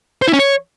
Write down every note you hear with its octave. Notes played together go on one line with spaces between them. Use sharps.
C5
E4
C#4
C#5